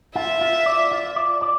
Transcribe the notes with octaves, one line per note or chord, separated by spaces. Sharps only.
F4 E5
F4
D5
F4
D5
D5